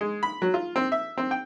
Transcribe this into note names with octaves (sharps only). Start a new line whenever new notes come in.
G#3
B5
F#3
F4
C4
E5
C4
G5